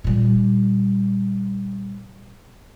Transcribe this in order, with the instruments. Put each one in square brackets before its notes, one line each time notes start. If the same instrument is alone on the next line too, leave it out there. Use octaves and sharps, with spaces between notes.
[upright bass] A#2 G3